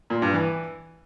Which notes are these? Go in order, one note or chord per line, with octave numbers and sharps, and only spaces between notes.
A#2
G2
E3